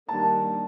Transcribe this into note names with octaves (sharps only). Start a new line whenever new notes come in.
D#3 G3 A#3 D4 A5